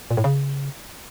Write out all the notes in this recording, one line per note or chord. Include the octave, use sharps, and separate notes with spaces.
A#2
A2
C#3